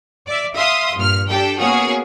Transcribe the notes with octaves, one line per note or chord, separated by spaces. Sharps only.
D5 E5
E5 F5 C6 D#6
G2 A#2 F6
D4 G4 A4 G5
A#3 B3 C#4 F#4 G#4 C#5